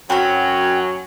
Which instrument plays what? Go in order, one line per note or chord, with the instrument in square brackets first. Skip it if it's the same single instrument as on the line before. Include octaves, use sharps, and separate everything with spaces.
[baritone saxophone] F#2 [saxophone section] F#3 [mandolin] C4 B5 [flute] G#5